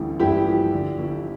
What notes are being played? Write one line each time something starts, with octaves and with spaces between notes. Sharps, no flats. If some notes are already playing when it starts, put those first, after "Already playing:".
Already playing: A1 D2 D3 G3
G2 E4 G4
F3
D3
G1